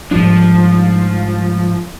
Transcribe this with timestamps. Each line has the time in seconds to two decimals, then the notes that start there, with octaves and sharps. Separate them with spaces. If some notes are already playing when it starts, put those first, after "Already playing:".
0.11 G#2 F3 G3 D4